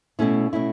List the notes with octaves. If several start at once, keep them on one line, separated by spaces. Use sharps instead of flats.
B2 A3 C#4 E4
B2 A3 C#4 E4